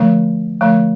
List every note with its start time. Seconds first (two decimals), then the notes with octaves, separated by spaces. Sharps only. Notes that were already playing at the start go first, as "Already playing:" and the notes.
Already playing: D3 F3 A3
0.61 D3 F3 A3